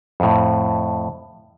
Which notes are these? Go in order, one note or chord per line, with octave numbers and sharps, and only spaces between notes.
F2 A2